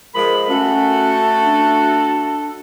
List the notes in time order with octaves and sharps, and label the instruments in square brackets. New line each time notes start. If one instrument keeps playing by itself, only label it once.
[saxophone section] F3 G#3 [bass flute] A#4 [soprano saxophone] B5
[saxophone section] A3 F#4 [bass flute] C#4 [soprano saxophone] A4
[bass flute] D4